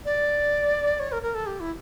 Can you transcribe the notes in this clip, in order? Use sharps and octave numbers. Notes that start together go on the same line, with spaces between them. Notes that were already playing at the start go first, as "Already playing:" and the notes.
D5
C#5
A#4
A#4
A4
G4
E4